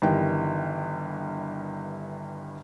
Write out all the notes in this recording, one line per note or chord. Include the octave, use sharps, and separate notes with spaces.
G1 G2 D#3 E3 G5